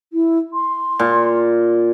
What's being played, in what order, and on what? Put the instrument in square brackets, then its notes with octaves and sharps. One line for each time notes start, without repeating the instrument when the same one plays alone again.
[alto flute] E4
C6
[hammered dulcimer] A#2